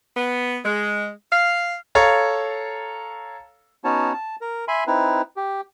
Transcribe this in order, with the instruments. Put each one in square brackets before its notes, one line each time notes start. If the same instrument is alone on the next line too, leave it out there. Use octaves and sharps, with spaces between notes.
[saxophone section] B3
G#3
F5
[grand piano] A4 C#5 F5 A#5
[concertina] B3 C#4 D#4 F#4 C#5 A5
A5
A#4
E5 G#5 B5 C6
C4 D#4 E4 B4
G4